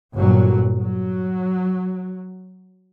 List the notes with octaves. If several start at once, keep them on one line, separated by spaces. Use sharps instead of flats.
G1 A#2 F#3
F#3